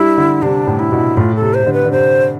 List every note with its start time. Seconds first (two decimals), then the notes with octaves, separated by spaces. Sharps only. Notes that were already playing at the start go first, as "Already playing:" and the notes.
Already playing: G3 D4 E4
0.18 D3
0.42 C3 D4
0.67 A2
0.79 E4
0.92 B2
1.17 A2 F4
1.35 A4
1.42 C3
1.54 C5
1.63 C3
1.67 D3
1.73 B4
1.85 D3
1.92 C3 C5